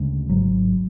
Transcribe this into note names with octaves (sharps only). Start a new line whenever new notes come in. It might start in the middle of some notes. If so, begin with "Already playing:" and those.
Already playing: D2 C#3 G#3
G#1 G#2 F#3